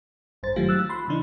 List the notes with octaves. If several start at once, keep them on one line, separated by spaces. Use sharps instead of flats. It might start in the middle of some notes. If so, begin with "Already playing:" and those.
G#1 G2 C5 A6
D#3 F#3 A3 F4 G4
E6 F#6 A6
B5 C6
C#3 E3 D4 D#4